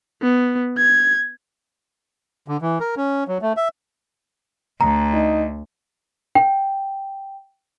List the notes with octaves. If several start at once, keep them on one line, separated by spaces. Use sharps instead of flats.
B3
G#6
D3
E3
A#4
C#4
F#3
A3
E5
D2 A#5
D#4
G5